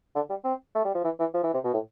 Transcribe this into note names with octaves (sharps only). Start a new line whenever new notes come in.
D3
G3
C4
A3
G3
F3
E3
E3
F3
E3
C3
B2
A2